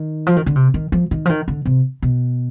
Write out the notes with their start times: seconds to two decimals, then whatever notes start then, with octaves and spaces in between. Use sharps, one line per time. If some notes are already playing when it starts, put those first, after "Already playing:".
Already playing: D#3
0.27 F3
0.36 D#3
0.46 D3
0.56 C3
0.74 D#3
0.92 F3
1.11 D#3
1.26 F3
1.29 D#3
1.48 D3
1.65 C3
2.02 B2